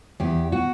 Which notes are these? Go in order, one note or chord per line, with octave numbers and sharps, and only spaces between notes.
E2 G4
F#4